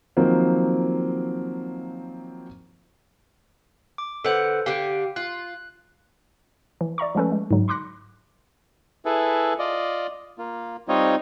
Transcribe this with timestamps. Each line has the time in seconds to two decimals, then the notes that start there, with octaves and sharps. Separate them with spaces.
0.17 D#3 F3 F#3 A#3 C4
3.98 D6
4.24 D3 A4 B4 C5 F#5
4.66 D3 G4 F5 G5
5.16 F4 F#6
6.81 E3
6.98 D5 E5 A#5 C#6
7.15 F3 G#3 A3 C#4 A4 B4
7.32 G#3
7.51 G#2 D3 F#3
7.68 B5 C6 D6 F#6 A#6 C#7
9.05 E4 G#4 A4 B4
9.59 F4 D5 D#5
10.38 A#3 F4
10.88 G3 C4 D#4 F4 C#5 D#5